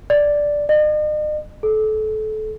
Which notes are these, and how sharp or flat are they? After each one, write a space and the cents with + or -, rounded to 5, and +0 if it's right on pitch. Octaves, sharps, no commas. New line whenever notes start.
D5 +0
D#5 -45
A4 -25